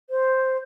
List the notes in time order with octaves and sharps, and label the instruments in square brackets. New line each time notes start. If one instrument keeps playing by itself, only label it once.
[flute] C5